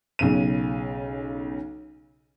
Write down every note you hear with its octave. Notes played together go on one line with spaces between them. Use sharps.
B1 C#3 D#7